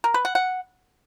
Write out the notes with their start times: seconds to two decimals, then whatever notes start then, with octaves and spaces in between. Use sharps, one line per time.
0.04 A#4
0.14 B4
0.25 F#5
0.35 F#5